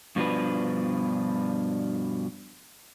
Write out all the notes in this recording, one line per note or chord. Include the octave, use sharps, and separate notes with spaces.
G2 B2 F3 D4 B4